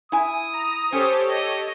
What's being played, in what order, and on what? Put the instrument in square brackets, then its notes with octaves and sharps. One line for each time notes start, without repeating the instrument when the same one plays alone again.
[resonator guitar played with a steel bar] E4 G#5 [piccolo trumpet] D#6
[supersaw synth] A#5
[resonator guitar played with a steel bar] C#4 [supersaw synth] G4 A4 C#5 [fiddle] C5
[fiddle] D#5